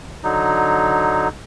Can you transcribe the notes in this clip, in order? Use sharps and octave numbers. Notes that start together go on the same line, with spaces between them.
D3 F#3 D#4